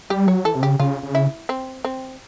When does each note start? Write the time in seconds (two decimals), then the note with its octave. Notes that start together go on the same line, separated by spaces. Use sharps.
0.10 G3 G4
0.27 F#3 C#5
0.45 E3 A4
0.55 C3
0.62 C#3 G4
0.80 C#3 F4
1.03 C#3
1.15 E4
1.49 C4
1.85 C4